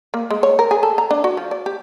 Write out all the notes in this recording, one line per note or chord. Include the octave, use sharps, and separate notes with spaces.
A#3
G#3
C#5
A#4
G#4
A4
A#5
D4
F#4
F3
D5
G4